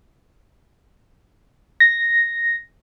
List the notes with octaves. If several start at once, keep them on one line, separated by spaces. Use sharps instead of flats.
A#6